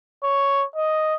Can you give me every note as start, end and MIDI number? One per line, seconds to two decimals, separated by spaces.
0.23 0.65 73
0.76 1.15 75